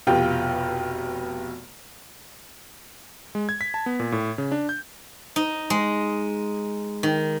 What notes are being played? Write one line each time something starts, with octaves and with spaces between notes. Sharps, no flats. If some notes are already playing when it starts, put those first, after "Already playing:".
F1 B2 F4 G4 G5
G#3
G#6
B6
A5
B3
A#2
A2
C#3
D4
G6
D#4
G#3
D#3